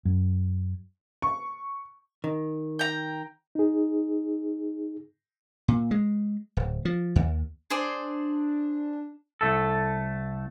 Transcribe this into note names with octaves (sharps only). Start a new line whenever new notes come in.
F#2
C#6
D#3
G5 A#5
D#4 G#4
A#2
G#3
D1
F3
D#2
D4 G#4 C5 D5
C2 A3 A4